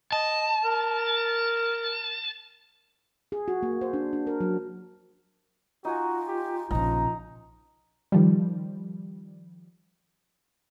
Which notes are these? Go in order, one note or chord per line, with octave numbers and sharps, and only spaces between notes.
D#5 A5
A#4
G#4
F#4
A#3
C5
D4
D4
A#4
F#3
D#4 F4 F#4 G#5
G4
A#1 C#3 F3 D#4 A#5
D#3 F3 G3